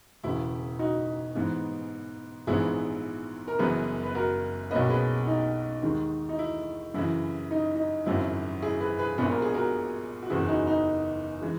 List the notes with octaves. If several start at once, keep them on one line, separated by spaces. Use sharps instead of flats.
E1 E2 C#3 E4
D#4 F#4
G#2 E3 B3
A#1 G#2 E3 B3 E4 G#4
A#4
F#1 F#2 E3 B3 G#4 B4
B4
F#4 A#4
B1 B2 A#3 C#4 B4 D#5
G#4 B4
D#4
D#2 D#3 G#3
D#4
E4
F#2 C#3 E3 E4
D#4
D#4
G#1 F#2 C#3 F#3 E4
E4 G#4
G#4 B4
G#4 B4
A#1 A#2 G#3 B3 B4
A#4
G#4
F#4 A#4
F#4
F#1 E2 C#3 E4 G#4
D#4 F#4
D#4
E3 G#3